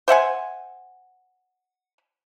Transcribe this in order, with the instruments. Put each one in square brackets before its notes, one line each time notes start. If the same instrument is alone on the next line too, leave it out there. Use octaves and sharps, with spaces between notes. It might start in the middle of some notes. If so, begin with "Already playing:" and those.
[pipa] C5 E5 F#5 G#5